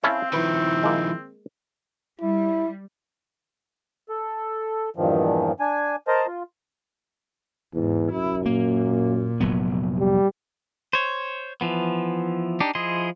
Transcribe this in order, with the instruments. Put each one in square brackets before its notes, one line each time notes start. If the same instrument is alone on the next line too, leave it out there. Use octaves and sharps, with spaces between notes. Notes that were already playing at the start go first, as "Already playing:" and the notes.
[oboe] C4 [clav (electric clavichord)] C#4 E4 A4 [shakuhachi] F5
[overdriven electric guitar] D#3 F3 [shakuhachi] E4 [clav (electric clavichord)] B4
[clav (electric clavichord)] G#3 A#3
[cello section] G3 [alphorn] E4
[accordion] A4
E2 G2 A#2 D#3 F3
D4 G#5
A#4 C5 D#5 A5 A#5
F4
[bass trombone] E2 [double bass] G#2
[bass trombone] F#2 [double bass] E4
[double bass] A#2 [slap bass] A#3
[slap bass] F1 F#3 B3
[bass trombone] G3
[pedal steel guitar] C5 C#5
E3 F3 B3
D4 D#4 G4
F3 E4 G#4 D#5 C6